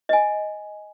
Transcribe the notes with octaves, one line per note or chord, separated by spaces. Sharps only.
D#5 G#5